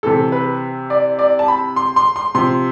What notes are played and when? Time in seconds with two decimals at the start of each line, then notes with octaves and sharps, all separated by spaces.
0.03 C3 E3 A4
0.32 B4
0.90 D5
1.19 D5
1.39 A5
1.48 B5
1.76 C6
1.96 C6
2.16 C6
2.35 C3 F3 C6